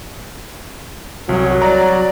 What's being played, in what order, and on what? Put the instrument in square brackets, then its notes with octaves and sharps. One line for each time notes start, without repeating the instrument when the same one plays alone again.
[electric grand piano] C2 [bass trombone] F#3
[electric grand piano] D5 A#5